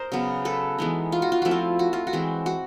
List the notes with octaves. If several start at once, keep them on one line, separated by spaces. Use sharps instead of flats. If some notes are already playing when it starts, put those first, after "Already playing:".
Already playing: A#4 C5 D#5
C#3 F#3 B3
A4 B4
E3 G#3 B3 D#4
F4
F#4
F4
F3 A3 C4 E4 F#4
F4
F#4
F4
F#4
E3 G#3 C4
F#4